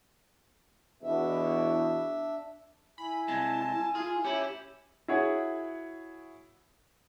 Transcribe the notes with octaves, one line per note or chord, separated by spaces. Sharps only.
E2 B2 D4 E5
E4 G#5 B5
G2 C3 G#3 A5
F4 G#4
C#4 E4 G4
E4 F#4 G#4 C#5 F#5